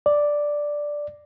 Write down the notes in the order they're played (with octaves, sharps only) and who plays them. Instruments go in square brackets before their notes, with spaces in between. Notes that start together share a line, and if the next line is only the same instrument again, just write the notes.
[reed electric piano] D5